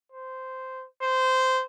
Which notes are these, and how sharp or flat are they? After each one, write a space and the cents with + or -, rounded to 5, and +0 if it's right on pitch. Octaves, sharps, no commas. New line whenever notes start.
C5 -10
C5 -15